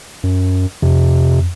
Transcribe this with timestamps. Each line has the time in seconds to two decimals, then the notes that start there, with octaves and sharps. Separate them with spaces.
0.23 F#2
0.82 F2 C3